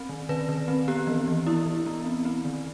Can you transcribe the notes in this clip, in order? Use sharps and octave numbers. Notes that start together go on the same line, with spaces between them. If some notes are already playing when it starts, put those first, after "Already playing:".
Already playing: C4
D#3
D#3 B4
D#3
C4
B3 G4
E3
E3
B3 E4
E3
B3
C4
C4
D#3